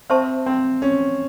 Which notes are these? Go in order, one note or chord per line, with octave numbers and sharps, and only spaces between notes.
C4 C5 E5 A5 C#6
C4
C#4